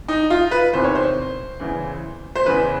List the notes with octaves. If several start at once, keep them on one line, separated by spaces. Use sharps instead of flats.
D#4
F4
B4
E2 C3 D#3 C5
C#5
C5
E2 C#3 E3
C5
E2 C#3 E3 B4